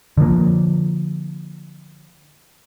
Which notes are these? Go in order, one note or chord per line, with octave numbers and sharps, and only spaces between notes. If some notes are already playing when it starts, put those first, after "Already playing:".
D3 F3 A#3